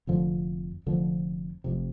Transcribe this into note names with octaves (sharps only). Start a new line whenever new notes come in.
F1 F2 D3 F3
F1 F2 D3 F3
F1 F2 C3